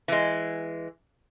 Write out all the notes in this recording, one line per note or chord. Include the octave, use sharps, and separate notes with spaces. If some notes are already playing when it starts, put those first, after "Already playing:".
E3 G#3